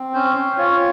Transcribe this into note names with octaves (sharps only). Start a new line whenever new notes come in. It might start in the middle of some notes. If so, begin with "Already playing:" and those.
Already playing: C4
C#4 C5
C#4
F4 C#5